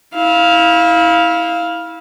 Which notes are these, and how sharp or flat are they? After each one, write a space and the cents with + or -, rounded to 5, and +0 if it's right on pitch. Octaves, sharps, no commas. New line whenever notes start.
E4 -25 F5 +0